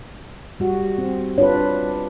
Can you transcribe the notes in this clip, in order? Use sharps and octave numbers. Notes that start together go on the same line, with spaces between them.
G3 F#4
C4
D4 F4 B4 C#5